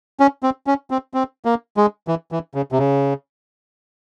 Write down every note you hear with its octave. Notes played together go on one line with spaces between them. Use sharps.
C#4
C4
C#4
C4
C4
A#3
G#3
E3
E3
C#3
C3
C#3